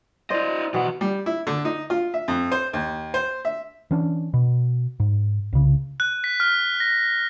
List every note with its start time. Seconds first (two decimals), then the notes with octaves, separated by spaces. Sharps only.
0.30 E4 C5 D5 D#5
0.74 B2 E3 F#5
1.01 G3
1.26 E4
1.47 D3
1.65 D#4
1.90 F4
2.14 E5
2.28 F2
2.52 C5
2.73 D#2
3.14 C5
3.45 E5
3.91 E3 C#4 D4
4.34 B2
5.00 G#2
5.53 C2 C#3
6.00 F#6
6.24 B6
6.40 F6
6.80 A#6